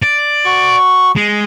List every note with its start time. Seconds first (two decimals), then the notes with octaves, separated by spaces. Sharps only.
0.02 D5
0.45 F#4 C#6
1.16 G#3